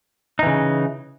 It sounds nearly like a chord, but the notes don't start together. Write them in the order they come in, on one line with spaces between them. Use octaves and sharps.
D#4 E3 C#3